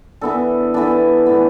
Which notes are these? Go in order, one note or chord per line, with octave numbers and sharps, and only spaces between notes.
E3 B3 D4 A4
E3 B3 D4 A4
A2 E3 B3